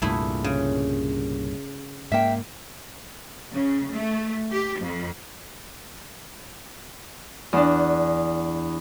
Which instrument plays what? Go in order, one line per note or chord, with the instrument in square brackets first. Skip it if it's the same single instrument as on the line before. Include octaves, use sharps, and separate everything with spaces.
[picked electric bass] C2 G2 A#2 [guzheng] A3 E4 G#4
[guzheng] C#3
[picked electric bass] G#2 A#3 [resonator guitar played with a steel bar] E5 G5
[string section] C#3
A3
G4
F2
[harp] E2 D4